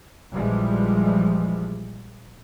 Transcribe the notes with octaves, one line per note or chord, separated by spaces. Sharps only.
A#1 E3 F3 G3 G#3